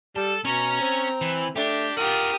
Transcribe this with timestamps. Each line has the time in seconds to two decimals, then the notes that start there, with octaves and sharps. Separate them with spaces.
0.16 G3 A4
0.45 B2 C#4 C#5 A#5
0.81 C4
1.21 E3
1.56 A3 D4 G4
1.97 F4 G4 A#4 F#5 D#6